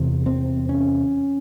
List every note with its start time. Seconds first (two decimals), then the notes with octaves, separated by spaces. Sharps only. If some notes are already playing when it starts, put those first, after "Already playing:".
Already playing: E2 C3
0.26 C4
0.69 C#4